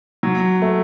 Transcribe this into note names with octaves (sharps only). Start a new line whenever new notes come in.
F#3
A3